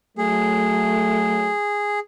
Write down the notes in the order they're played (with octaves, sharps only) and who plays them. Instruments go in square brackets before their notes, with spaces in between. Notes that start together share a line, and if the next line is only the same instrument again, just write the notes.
[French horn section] F#3 A3 [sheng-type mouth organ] G#4